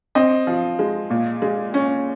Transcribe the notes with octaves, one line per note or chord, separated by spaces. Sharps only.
C4 D#5
F3
G#3
A#2
G#3
C#4